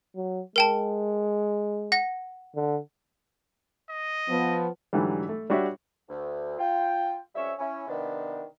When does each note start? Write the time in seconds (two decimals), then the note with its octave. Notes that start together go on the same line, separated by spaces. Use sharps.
0.15 F#3
0.56 G#3 A#4 G5 A5
1.92 F#5 A#6
2.55 D3
3.90 D#5
4.29 F3 B3
4.93 G#2 D3 E3 F#3 G3
5.29 A3
5.50 G3 D4 F#4 C#5 E5
6.09 D2
6.58 F4 G5
7.35 F2 G3 C#4 C#5 E5
7.59 C#4 E4
7.88 C3 D#3 B3 D4